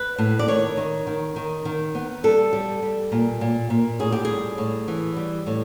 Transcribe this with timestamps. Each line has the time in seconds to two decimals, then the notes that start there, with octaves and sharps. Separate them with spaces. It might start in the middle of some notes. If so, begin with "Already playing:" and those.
Already playing: B4
0.18 A2
0.39 D5
0.48 D#3 C#5
0.77 D#3
1.07 D#3
1.36 D#3
1.65 D#3
1.95 B3
2.24 G3 A4
2.53 G3
2.82 G3
3.12 A#2
3.41 A#2
3.70 A#2
3.99 A2 G#4
4.12 G4
4.25 G3 G#4
4.58 A2
4.88 E3
5.16 G3
5.47 A2